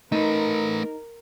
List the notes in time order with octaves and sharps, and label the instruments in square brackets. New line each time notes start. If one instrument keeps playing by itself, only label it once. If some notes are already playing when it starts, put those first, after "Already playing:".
[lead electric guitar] A3 B4 [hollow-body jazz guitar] D#4 [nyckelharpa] A#4